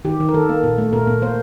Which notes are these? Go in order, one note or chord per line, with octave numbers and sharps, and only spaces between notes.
D#3 G4
D#3
A#4
D#3 A4
A#3
A#2
A3
A#2 A#4
A#2
A#3 C5